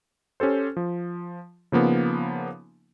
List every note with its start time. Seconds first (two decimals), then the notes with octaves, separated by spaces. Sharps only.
0.40 C#4 G4 A4 C5
0.77 F3
1.72 C#3 F3 A#3 B3 D#4